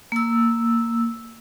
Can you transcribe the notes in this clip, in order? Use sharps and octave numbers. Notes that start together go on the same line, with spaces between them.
A#3 E6